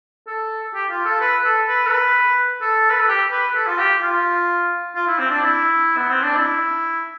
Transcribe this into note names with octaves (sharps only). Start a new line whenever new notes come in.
A4
G4
F4
A4
B4
A4
B4
A4
B4
A4
B4
A4
G4
B4
A4
F4
G4
F4
F4
E4
C4
D4
E4
B3
C4
D4
E4